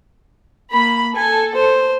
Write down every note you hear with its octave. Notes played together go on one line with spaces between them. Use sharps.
A#3 B5
A4 G#5
C5